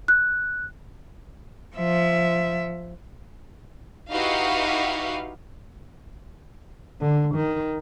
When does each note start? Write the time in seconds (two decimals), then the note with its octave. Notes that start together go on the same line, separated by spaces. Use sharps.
0.08 F#6
1.76 F3 E5
4.10 D#4 E4 F#4 G4 B4 F5
7.01 D3
7.35 D#3